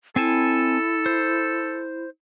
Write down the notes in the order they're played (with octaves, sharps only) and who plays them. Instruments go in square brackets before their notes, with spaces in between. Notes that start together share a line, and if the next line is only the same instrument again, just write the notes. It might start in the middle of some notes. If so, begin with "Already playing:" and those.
[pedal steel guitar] C4 G#5 A5 [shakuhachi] E4 [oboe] A4
[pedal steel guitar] C5